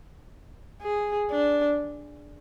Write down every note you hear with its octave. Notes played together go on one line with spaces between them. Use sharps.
G#4
D4